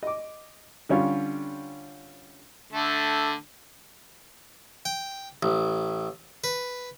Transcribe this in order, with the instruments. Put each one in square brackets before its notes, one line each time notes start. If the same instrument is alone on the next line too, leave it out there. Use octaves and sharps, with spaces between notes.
[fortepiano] D#5 D6
D3 G3 C#4 D4 F4
[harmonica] D3 A3
[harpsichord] G5
A1
B4